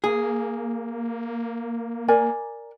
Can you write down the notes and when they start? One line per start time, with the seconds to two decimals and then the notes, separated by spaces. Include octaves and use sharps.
0.04 A#3 G#4
2.08 A#4 D5 G#5